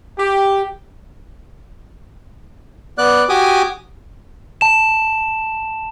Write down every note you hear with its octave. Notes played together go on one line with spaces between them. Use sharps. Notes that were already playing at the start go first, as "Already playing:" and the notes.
G4
B3 D5 F#6
F#4 G4 G#5 D6 D#6
A5 E7